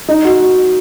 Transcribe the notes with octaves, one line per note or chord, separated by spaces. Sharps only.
D#4
F#4